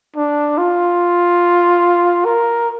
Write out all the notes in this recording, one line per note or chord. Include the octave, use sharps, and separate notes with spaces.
D4
F4
A#4